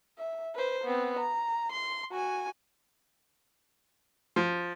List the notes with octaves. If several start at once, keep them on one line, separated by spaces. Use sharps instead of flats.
E5
B4 C5
B3 C4
A#5
C6
F#4 G#5
F3